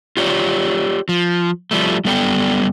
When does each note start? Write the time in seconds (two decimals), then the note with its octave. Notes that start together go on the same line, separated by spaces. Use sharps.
0.17 F4 G4 C#5 D5
1.09 F3
1.71 F3 G3 A3
2.05 F#2 G3 B3 A4 D5 G5